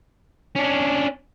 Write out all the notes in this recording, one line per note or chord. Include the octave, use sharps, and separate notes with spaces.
C#4 D4